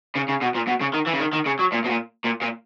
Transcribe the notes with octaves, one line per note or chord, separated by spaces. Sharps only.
C#3
C#3
B2
A#2
B2
C#3
D#3
E3
C#3
D#3
D#3
C#3
F#3
A#2
B2
A#2
A#2
A#2